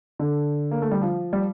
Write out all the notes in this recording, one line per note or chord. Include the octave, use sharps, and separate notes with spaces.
D3
A#3
A3
G3
F3
G3